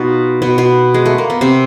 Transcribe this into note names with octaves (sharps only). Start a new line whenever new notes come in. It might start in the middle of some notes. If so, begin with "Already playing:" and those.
Already playing: B2 B3 D#4 F4
B2 B3
B2 B3
G#3
A3
A#3
B3
C3 C4